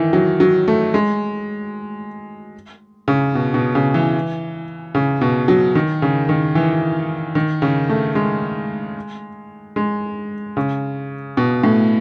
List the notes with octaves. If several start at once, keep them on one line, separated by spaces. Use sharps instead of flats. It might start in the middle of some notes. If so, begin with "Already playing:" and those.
Already playing: D#3 E3
F#3
F#3
A3
G#3
C#3
B2
B2
C#3
E3
C#3
B2
F#3
D#3
C#3
D#3
E3
D#3
C#3
A3
G#3
G#3
C#3
B2
A2